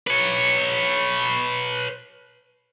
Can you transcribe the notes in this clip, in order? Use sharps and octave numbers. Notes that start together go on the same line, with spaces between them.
B4 C#5